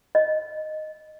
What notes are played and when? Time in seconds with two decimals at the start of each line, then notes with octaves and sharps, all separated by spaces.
0.15 D#5